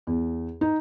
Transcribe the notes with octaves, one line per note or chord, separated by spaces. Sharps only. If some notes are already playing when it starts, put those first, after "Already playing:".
E2
D#4